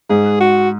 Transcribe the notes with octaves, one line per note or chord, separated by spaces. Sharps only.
G#2 G#4
F#4